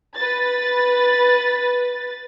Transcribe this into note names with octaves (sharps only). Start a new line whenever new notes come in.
B4 A6